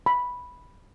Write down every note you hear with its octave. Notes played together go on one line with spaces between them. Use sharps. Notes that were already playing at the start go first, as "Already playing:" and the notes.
B5